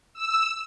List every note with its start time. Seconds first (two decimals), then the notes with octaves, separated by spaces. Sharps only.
0.14 E6